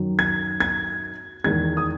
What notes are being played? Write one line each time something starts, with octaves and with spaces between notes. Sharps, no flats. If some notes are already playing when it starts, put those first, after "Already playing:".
Already playing: F#2 D#3 F#3
G#6
G#6
E2 D#3 G#3 G#6
D#6